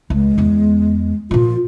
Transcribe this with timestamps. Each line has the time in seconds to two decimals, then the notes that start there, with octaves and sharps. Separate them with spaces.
0.10 C#2 G#3
0.38 E2 B3
1.31 A#2 F3 F4